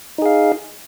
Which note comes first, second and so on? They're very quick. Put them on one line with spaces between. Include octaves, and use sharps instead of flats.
D#4 G#4 F5